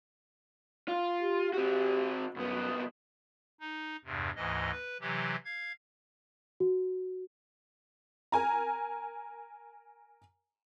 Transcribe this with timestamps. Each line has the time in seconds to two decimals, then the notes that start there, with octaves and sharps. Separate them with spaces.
0.88 F4
1.22 G4
1.53 C4 F#4 G4
2.36 C2 F#2 B3
3.61 D#4
4.05 E2 G2 C3
4.35 D2 G#2 E3 D#5
4.71 B4
5.01 C3 E3 F#3 G4
5.45 F5 G#6
6.60 F#4
8.32 A#4 G#5 A#5